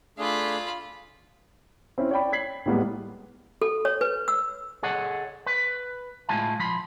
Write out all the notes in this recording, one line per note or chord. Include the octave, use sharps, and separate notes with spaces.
A3 D4 F4 G#4 B5
C4 C#4 E4
C#5 D5 G5 B5
G#6 B6 C7 F#7
A2 G3 G#3 A#3 B3
A4
C#5
B4
E6
G#4 A4 C#5 D#5 F#5
B4
A2 G#3 E4 F4 G#5 A5
F3 B5 C6